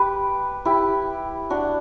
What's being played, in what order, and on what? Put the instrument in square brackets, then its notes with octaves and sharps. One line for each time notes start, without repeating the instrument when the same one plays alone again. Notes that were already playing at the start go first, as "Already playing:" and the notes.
Already playing: [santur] G4 B4
E4 G4
D4 F#4